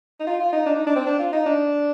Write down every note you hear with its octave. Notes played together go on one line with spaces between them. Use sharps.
D#4
F4
F4
D#4
D4
D#4
D4
C4
D4
F4
D#4
D4